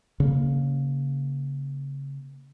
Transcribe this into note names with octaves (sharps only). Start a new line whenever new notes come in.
C#3 A#3